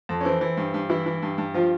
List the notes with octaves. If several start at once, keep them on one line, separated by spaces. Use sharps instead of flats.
F2
C#4
E3 C4
E3
G2
G2
E3 E4
E3
G2
G2
F3 F4